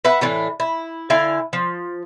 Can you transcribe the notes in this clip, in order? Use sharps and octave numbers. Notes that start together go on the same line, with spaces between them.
B4 E5 F#5
A2 E3 D4
E4
D3 E4 F5 G#5
F3